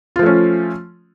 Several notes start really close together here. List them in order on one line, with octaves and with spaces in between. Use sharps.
F4 F3 A3 C#4